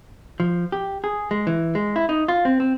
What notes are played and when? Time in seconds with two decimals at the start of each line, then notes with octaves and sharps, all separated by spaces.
0.40 F3
0.72 G4
1.04 G#4
1.31 G#3
1.47 E3
1.75 G#3
1.96 E4
2.09 D#4
2.28 F4
2.45 C4
2.60 C4